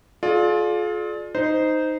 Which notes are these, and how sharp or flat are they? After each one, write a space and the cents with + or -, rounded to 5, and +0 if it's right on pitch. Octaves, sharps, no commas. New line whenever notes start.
F4 +20 G#4 +45 D5 +20
D#4 +0 C5 -15